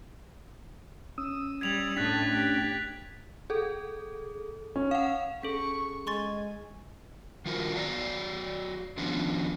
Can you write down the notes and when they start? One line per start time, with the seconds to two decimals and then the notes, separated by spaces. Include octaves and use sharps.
1.18 C#4 D#6 E6
1.61 G3 G#6 F7 F#7
1.96 A2 A3 C#4 D4 G5 F#6 A6 B6
2.32 G4
3.50 G#4 A4
4.76 C#4
4.91 F5 F#5
5.43 C#4 G#4 A4 C#6
6.07 G#3 G#5 C6 C#6 A6
7.46 D#3 G3 F4 F#4 A#4 C5
7.75 F#3 D5 A#5
8.97 D#3 F3 B3 C#4 D4